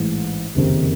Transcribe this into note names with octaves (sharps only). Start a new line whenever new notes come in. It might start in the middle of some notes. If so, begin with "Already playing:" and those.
Already playing: A1 G#2 E3
F#1 F2 C3 D#3